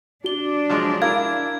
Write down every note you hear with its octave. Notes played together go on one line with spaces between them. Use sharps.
D4 F#4 G7
F3 F#3 G#3
E4 A#4 F5 G#6